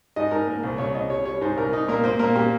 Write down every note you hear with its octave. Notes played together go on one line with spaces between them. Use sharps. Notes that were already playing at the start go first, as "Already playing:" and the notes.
G#2 D#5
G#2 A#4
A#3 A#4
C2 C5
C2 C#5
C2 D#5
G3 C#5
G3 C#5
G#2 C5
C2 A#4
D#4
A#2 A#4
A#3 C5
A#2 A#4
A#2 G4